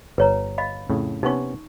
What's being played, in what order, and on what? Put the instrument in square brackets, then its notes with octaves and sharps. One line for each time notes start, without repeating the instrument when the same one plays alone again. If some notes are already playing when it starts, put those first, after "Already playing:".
[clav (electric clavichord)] G1 [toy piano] B4 C#5 A#5
[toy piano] D#5 F5 B5
[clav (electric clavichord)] F2 A2 C#3
[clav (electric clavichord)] C3 B3 C#4 [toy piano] D#4 C#6